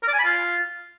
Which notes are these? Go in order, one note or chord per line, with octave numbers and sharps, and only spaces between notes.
A#4
D5
G#5
B5
F4